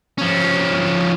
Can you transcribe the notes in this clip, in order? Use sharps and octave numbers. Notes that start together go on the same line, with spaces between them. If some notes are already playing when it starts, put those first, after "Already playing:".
F3 C#4